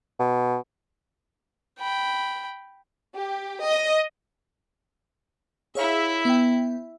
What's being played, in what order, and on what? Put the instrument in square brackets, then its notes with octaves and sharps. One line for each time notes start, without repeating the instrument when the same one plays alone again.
[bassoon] B2
[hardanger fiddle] G5 B5
[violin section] G4
D#5
[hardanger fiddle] E4 E5 [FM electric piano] G#4 C#5 F5
[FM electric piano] B3 G5